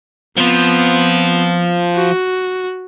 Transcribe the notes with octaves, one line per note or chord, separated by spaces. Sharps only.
F3 B3 C4 F4
F#4